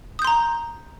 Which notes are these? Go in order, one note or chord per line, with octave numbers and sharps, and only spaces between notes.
A#5 C6 D#6 G6